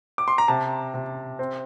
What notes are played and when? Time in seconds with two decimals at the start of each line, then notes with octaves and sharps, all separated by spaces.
0.18 D6
0.28 C6
0.38 A#5
0.48 C3 A5
0.94 C3
1.39 C4